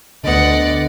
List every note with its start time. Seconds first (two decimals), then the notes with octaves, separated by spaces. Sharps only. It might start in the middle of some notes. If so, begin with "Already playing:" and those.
0.24 D2 D3 B3 D5 D#5 F#5